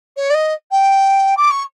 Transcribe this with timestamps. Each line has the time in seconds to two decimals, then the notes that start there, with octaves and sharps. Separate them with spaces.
0.17 C#5
0.30 D5
0.34 D#5
0.71 G5
1.37 D6
1.51 C#6